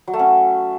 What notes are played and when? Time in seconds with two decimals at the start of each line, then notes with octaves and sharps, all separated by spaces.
0.07 F#3
0.13 A3
0.19 C#4